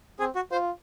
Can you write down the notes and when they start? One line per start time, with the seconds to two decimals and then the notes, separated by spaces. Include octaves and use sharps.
0.20 C4 G#4
0.35 F#4
0.51 F4 C5